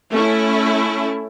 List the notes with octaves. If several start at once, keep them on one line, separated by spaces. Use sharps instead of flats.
A3 C#4 E4